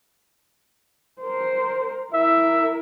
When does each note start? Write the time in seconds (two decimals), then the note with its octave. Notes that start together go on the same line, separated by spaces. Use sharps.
1.22 A#4 C5
2.13 E4 A#4 E5